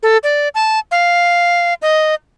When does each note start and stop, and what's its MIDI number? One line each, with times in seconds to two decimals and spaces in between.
0.03 0.18 69
0.24 0.49 74
0.55 0.79 81
0.91 1.74 77
1.82 2.15 75